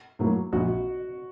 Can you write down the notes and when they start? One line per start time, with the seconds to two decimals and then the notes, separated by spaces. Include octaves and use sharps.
0.19 A2 F#3 A#3
0.52 A#1 F#4